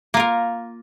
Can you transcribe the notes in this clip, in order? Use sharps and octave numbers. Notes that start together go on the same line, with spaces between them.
A#3 F4 A#4